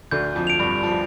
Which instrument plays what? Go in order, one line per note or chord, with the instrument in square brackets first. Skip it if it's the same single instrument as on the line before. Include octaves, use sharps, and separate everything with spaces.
[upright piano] D2 D3 [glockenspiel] G6
[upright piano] F2 F3
[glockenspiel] D7 F7
[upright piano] G2 G3
[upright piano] F3 [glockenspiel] A5
[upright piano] G3